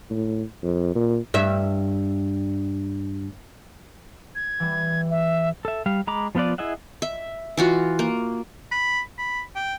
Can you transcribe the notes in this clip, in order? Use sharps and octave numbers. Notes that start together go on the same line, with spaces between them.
A2
F2
A#2
G2 E5
G#6
E3 G3
E5
A4 E5
G3 F5
G#3 A#5 B5 D6
F3 B3 F4 B4 D5
E4 G#4 D#5 E5 F#5
E5
E3 F4 F#4
A#3
B5
B5
G5